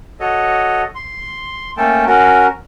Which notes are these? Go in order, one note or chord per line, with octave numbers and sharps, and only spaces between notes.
F#4 A4 C#5 D#5
C6
A3 A#3 C#4 A4 G5 A5
C#4 F#4 A#4